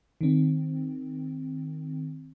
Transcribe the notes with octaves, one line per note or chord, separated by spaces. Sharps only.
D#3 C4